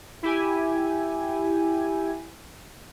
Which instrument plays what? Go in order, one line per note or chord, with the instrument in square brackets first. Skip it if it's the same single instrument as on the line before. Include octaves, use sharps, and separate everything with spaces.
[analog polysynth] E4 G4 G#5